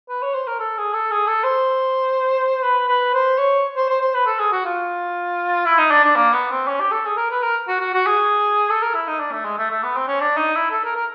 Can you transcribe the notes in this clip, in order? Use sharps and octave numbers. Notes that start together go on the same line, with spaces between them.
B4
C#5
C5
A#4
A4
G#4
A4
G#4
A4
C5
B4
B4
C5
C#5
C5
C5
C5
B4
A4
G#4
F#4
F4
E4
D#4
D4
D4
A#3
B3
C4
C#4
G4
A4
G#4
A#4
B4
A#4
F#4
F#4
F#4
G#4
A4
A#4
E4
D#4
D4
A3
G#3
A3
A3
B3
C4
C#4
D4
D#4
E4
A4
A#4
A#4